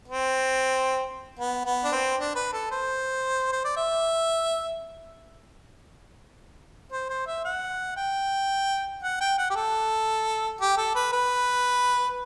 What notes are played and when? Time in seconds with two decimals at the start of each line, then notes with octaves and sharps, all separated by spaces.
0.08 C4
1.39 B3
1.65 B3
1.84 D4
1.92 C4
2.18 D4
2.35 B4
2.53 A4
2.71 C5
3.52 C5
3.64 D5
3.76 E5
6.92 C5
7.09 C5
7.27 E5
7.45 F#5
7.96 G5
9.03 F#5
9.20 G5
9.38 F#5
9.50 G4
9.55 A4
10.60 G4
10.77 A4
10.95 B4
11.12 B4